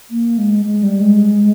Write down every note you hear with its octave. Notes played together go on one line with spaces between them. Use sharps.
A#3
G#3
G#3
G3
G#3